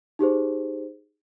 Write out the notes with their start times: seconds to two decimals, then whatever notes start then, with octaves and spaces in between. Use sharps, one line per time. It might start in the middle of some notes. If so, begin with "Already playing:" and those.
0.19 D#4 G4 G#4 C5